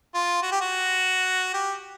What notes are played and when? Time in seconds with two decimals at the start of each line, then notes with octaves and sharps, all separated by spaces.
0.15 F4
0.42 F#4
0.52 G4
0.61 F#4
1.54 G4